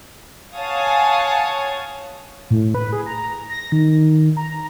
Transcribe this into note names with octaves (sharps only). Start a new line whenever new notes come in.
C#5 F5 F#5 G#5 A5 D#6
A2
B4
G#4
A#5
A#6
D#3
A#5